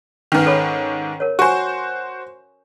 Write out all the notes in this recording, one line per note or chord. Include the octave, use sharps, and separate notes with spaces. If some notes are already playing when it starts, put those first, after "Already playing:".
G#2 D#3 C#4 B4
A4 C#5 B5
A#4 C#5
F#4 C5 G#5 C#6